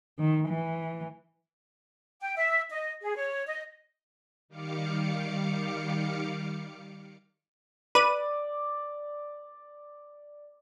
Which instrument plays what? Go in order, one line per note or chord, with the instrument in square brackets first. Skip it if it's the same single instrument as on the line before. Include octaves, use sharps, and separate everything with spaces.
[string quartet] D#3
E3
[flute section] G5
E5
D#5
G#4
C#5
D#5
[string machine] D#3 G3 F5 D6 C#7
[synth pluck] B4 D#7 [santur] D5